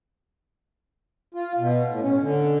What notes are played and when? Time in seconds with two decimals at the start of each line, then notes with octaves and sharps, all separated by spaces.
1.34 F4
1.58 B2
1.88 A2
2.02 C#4
2.20 D3